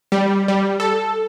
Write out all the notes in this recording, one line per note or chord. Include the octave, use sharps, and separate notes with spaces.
G3
G3
A4